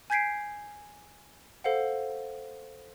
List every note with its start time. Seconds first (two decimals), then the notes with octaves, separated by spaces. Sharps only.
0.10 G#5 G6 G#6 B6 C7 D7
1.64 A4 C5 F5 F#5